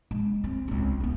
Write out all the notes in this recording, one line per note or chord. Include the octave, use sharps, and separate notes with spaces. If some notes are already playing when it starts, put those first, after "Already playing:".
G#3
C4
C#2 C4
A3 B3